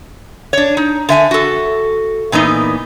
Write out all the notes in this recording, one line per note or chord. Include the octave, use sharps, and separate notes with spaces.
D4 C#5
D#4
D3 E5 G#5
F#4 A4
A#2 E3 B3 D#4